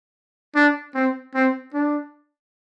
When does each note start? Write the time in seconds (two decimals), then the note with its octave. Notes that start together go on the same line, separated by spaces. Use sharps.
0.55 D4
0.94 C4
1.34 C4
1.73 D4